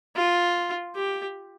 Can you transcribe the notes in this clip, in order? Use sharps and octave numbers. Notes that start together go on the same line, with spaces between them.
F4
G4